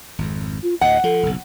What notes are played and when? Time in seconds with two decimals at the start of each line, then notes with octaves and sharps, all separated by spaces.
0.18 G#1 F2
0.63 F4
0.81 D2 A2 D#5 F#5
1.04 F3 A4
1.23 F#1 B1